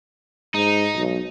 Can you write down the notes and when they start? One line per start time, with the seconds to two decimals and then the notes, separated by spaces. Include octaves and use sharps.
0.54 G#2 D#4
0.95 B1